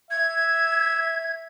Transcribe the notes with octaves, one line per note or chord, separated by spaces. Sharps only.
E5 G#6